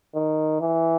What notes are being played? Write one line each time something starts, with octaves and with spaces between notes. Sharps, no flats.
D#3
E3